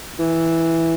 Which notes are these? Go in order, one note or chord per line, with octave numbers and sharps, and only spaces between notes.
E3